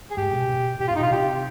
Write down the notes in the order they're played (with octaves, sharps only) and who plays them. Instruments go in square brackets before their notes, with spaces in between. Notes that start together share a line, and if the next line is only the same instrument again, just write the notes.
[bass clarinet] G#4
[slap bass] G#2 [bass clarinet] G4
[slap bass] B2
B2
[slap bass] B2 [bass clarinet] G4
[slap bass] G#2 [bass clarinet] F4
[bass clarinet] D#4
[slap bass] B2 [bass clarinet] F4
[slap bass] C3 [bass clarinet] G4